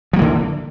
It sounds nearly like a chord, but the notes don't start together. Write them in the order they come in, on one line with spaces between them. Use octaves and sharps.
F3 A#3 E3 D3